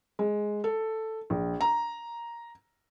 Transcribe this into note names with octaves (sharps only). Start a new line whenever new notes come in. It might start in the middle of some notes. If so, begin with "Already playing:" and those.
G#3
A4
A#1
A#5